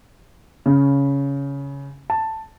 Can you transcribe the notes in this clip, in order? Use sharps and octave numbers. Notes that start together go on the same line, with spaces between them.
C#3
A5